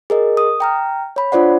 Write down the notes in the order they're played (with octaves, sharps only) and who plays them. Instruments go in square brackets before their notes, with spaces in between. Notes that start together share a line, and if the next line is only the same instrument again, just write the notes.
[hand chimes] G#4 A#4 D#5
D#6
G5 A#5 F6
C#5 B5
D4 F4 C5 D5 F#5